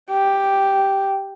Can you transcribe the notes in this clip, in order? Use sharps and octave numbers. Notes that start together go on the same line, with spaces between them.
G4